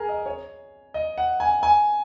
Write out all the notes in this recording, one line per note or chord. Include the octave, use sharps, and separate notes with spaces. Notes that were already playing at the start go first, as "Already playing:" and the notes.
Already playing: G#4 A#4 G#5
D#5
C#5
D#5
F#5
G#5
G#5